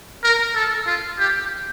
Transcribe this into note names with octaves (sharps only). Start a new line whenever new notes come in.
A#4
A4
F4
G4